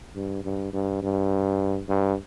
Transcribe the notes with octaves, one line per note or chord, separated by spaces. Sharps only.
G2
G2
G2
G2
G2